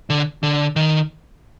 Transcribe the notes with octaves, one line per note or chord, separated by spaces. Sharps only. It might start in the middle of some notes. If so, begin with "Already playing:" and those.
D3
D3
D#3